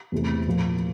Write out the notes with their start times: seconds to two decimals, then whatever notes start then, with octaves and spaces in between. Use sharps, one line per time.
0.12 E2 C3 E3 A3
0.47 A#2 F3 A#3 F4